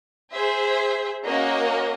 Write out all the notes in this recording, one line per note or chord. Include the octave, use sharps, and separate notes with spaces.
G#4 C5 E5
A#3 C#4 F#4 A#4 D#5